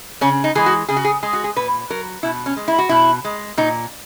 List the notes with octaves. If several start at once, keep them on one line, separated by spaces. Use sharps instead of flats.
C#3 C#4
D#4
E3 G#3 G#4
F#4
C#3 G#4
F#4
G#4
G#3 G#4
F#4
G#4
A#2 B4
F#3 A#4
B2 E4
C#4
G#3
E4
F#4
B2 E4
G#3
A#2 D#4